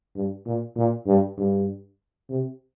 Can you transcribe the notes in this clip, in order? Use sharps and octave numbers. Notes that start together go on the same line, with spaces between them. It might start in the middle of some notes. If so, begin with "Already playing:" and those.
G2
A#2
A#2
G2
G2
C3